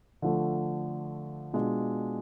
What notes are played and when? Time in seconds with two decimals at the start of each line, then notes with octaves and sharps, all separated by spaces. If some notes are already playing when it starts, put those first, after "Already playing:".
0.22 D3 F3 A3
1.53 B2 G#3 D4 F4